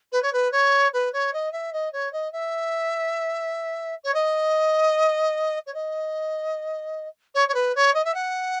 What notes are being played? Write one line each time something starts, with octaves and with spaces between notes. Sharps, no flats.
B4
C#5
B4
C#5
B4
C#5
D#5
E5
D#5
C#5
D#5
E5
C#5
D#5
C#5
D#5
C#5
C#5
B4
C#5
D#5
E5
F#5